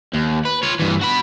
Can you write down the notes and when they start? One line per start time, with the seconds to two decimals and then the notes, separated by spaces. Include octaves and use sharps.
0.14 D#2
0.45 B4
0.63 F4 C#5
0.79 G2 E3
1.01 F#4 B5